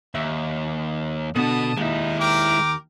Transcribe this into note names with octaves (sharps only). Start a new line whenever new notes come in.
D#2 E5
B2 D3 B3 F#4 A5 D#6
D#2 G#3 D#4 E4
A#4 G5 D6